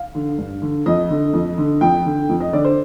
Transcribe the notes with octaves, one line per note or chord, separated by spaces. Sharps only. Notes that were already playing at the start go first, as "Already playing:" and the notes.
Already playing: F5
D3
G2
D3
F2 D#5
D3
F2
D3
F2 G5
D3
F2
D#5
D3 D5
C5